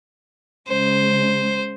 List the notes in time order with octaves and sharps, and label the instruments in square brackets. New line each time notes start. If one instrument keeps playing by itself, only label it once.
[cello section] C#3 G#3 [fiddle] C5